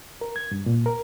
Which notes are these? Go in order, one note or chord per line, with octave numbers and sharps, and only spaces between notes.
A#4
G#6
G2
A#2
A#4